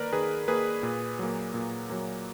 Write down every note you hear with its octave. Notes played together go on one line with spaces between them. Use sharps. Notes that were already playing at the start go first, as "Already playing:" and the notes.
Already playing: D#3 A#3 A#4 B4 D5
D#3 G#4 B4
A#3 G#4 B4
A#2
F#3 A#3
A#2
F#3 A#3